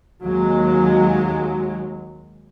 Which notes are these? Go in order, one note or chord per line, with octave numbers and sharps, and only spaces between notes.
D#2 F#3 G#3